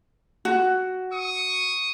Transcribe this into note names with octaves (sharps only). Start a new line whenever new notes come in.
F#4
C#6 D#6